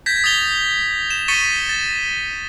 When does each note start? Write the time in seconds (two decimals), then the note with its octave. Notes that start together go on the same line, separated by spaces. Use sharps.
0.06 G6 G#6 A#6 B6
0.24 D#6 A6 F7 G7
1.10 E7
1.28 C#6 A6 B6 C#7 D#7 G7
1.69 A6